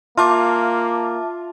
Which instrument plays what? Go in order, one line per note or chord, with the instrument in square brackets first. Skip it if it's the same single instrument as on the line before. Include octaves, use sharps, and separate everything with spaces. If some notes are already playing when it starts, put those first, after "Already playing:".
[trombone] A#3 [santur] F4 [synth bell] E5 A5 D6